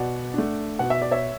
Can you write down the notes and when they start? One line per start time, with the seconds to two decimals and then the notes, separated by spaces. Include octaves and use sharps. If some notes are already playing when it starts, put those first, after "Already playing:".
Already playing: B2 D5 F#5
0.34 A3 D4
0.79 B2 F#5
0.90 E5
1.02 D5
1.11 C#5 E5